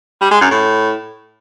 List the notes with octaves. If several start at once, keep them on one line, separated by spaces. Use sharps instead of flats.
G3
G#3
F#2
A2